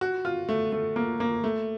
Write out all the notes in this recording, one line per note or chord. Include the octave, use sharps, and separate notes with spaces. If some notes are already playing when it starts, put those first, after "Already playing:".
F#4
F4
A3
A3
A#3
A#3
A3